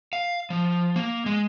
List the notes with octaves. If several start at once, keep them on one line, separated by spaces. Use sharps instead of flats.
F5
F3
A#3
G#3